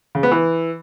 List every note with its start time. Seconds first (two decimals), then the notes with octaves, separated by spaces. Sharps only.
0.15 C#3
0.23 B3
0.31 E3